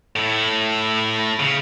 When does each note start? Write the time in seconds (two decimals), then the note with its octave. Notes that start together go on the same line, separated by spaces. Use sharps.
0.16 A2 E4
1.39 C#3